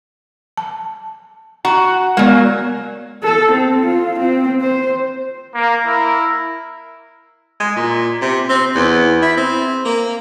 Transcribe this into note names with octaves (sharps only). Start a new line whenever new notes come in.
A5
F#4 A#5
F#3 G#3 A#3 B3 D5
A4
C4
F4
C4
C5
A#3
E4 A#4
G#3
A#2
C3
C4
E2
E4
C4
A#3